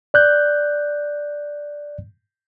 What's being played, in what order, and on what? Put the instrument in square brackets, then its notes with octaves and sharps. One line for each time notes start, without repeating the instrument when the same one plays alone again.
[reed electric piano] D5 F#6 G6